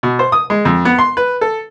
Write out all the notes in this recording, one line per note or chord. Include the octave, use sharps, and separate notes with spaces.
B2
C5
D#6
G#3
F2
B3
C6
B4
A4